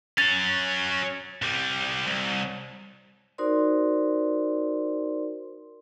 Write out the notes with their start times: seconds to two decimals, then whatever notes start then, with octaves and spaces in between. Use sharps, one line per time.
0.18 F#3 C#4 A6
1.42 C2 G3
2.07 C2
3.38 D#4 F#4 A#4 C5 D5 C6